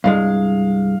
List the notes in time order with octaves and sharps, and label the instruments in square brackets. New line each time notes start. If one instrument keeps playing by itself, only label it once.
[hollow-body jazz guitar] C2 G2 G#3 [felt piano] F5